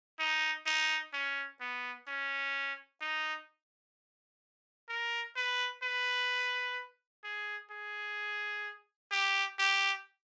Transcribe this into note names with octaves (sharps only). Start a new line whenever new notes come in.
D#4
D#4
C#4
B3
C#4
D#4
A#4
B4
B4
G#4
G#4
G4
G4